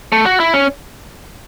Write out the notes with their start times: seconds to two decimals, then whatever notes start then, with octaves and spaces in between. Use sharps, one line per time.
0.12 A3
0.25 F#4
0.40 E4
0.54 C#4